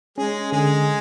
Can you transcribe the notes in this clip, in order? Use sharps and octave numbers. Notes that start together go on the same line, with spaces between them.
G#3 C#4 G#4
D3 G#3 G#4